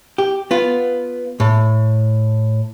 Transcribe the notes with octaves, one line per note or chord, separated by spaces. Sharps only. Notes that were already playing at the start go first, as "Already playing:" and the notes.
G4
B3 F4
A2